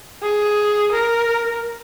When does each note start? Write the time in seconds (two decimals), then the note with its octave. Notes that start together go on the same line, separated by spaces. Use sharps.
0.22 G#4
0.92 A#4